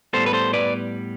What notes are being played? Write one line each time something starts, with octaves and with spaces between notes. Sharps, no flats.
A2 G3 B3 A4 C5
B4
A4 C5
B4 D5